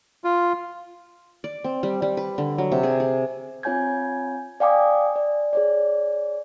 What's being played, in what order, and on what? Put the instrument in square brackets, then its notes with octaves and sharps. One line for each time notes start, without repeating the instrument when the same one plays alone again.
[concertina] F4
[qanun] D5
C4
G3
G3
B4
D3
F#3
C3
G#4
G#4
[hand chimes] C4 F4 C#5 G#5 G6 G#6
D5 F5 G5 G#5 D6 D#6
D5
G#4 C#5 D5